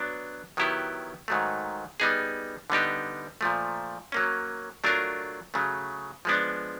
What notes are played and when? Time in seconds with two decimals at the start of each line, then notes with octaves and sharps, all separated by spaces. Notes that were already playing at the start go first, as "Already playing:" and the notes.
Already playing: F#3 B3 D4
0.57 D#3 F#3 B3 E4 G4
1.28 G#2 D#3 F#3 A3
2.00 G3 B3 D#4 G#4
2.70 D3 G3 B3 D#4 G4
3.41 A#2 F3 A3
4.12 F#3 A#3 C#4
4.84 F#3 A3 D4 F4 A#4
5.54 C#3 F#3 A3
6.25 F3 G#3 B3 D4